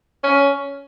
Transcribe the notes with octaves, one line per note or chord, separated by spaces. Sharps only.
C#4